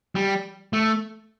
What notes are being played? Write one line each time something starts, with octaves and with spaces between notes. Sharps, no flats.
G3
A3